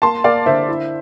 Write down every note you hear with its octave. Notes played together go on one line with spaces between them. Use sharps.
A#3 A5 C6
A#3 D5 F5
D3 C5 E5
E4